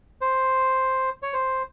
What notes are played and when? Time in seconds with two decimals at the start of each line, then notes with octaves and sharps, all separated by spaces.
0.21 C5
1.23 C#5
1.33 C5